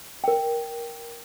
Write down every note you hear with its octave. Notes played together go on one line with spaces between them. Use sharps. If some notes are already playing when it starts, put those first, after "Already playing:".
A#4 G5